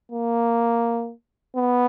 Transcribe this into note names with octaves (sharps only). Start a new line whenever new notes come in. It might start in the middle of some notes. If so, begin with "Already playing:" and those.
A#3
B3